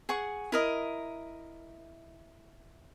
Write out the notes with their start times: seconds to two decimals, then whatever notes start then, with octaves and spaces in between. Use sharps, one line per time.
0.09 G#4 F#5 C#6
0.52 E4 A#4 D#5